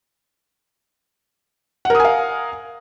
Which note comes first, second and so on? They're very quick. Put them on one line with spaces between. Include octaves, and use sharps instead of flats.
F#5 A#4 D#6 G#5 F5